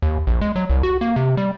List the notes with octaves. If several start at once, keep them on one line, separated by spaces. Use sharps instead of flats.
D#2
A#1
G#3
F#3
C2
F#4
A#3
C3
G3